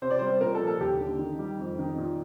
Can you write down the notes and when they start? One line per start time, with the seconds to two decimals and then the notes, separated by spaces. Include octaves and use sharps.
0.02 C3 C5
0.10 D5
0.19 G3 C5
0.41 A#2 A#4
0.55 A4
0.60 F3
0.67 A4
0.80 D#2 G4
0.99 D3
1.19 D#3
1.39 G3
1.59 F2
1.79 D#3
1.98 A#2